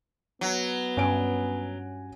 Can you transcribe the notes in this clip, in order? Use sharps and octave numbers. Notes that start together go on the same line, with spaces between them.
F#3 B3
G2 C#4 G#5 D7